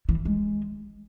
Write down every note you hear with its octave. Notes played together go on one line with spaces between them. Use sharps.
E3
G#3